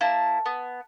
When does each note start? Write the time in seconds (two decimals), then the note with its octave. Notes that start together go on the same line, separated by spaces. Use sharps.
0.01 A#3 E4 A5
0.46 B3